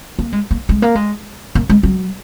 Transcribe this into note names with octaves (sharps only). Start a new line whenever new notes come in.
A#3
G#3
A#3
G#3
A#3
G#3
A#3
G#3
F#3